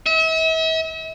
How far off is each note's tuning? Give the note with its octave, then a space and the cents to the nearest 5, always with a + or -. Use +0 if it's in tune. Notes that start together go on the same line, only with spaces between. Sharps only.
E5 -40